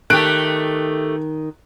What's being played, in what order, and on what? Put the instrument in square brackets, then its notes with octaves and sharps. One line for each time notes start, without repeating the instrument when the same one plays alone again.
[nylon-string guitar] D#3 [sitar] A3 G4 [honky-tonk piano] F#6 D7